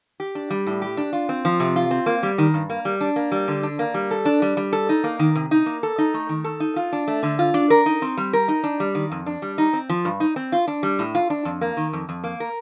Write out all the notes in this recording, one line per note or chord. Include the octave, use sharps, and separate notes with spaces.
G4
D4
G3
A2
G4
D4
F4
C4
F3
C3
F4
C4
A#3
G3
D#3
G2
A#3
G3
D4
A#3
G3
D3
D4
A#3
G3
A4
D4
G3
G3
A4
D#4
A#3
D#3
C3
D#4
A#3
A4
D#4
A3
D#3
A4
D#4
F4
D4
A3
D3
F4
D4
A#4
D#4
C4
G3
A#4
D#4
D4
G3
D#3
F2
D4
G3
D#4
C4
F3
G2
D#4
C4
F4
D4
G3
A2
F4
D4
F2
A#3
D#3
F2
F2
A#3
A#4